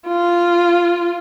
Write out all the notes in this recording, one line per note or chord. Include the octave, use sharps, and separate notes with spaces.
F4